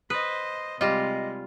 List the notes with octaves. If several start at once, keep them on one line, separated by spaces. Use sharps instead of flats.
B4 C5 D#5 D#6
C3 G3 G#3 F4 D#5 A#6